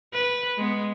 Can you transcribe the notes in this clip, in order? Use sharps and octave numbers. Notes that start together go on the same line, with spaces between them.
B4
G#3 B3